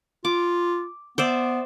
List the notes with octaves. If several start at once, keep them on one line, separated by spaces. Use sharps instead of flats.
F4 D6
B3 C5 D5 E5